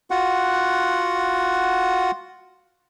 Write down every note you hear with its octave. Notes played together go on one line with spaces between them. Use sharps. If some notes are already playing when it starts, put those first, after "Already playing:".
F4 F#4 F#5